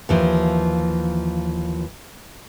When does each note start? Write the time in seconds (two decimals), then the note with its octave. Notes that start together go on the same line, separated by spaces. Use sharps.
0.09 D#2 E3 F3